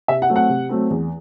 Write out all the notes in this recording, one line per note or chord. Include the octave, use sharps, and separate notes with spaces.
C3 E5
F#5
F#3 A3 C4
F#5
C3
F#3 A3 C4
E2